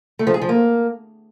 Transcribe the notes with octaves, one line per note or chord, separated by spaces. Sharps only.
A3
F3
G#4
F3
A#3